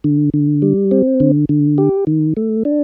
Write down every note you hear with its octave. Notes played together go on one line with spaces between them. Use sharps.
D3
D3
G3
C4
D3
D3
G4
D#3
A3
D4